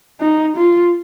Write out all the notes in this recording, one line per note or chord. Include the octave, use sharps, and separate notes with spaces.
D#4
F4